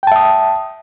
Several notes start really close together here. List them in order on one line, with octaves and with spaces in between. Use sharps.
G5 A5 E5 D#6